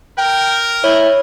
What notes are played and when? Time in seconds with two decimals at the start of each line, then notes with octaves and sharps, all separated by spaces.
0.18 A#4 G5
0.84 E4 C#5